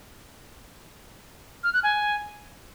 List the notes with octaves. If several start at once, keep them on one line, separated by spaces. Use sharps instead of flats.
F6
F#6
G#5